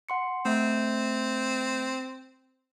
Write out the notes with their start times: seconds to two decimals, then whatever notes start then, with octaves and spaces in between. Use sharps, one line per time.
0.09 F#5 C6 C#7
0.45 A3 C4 E5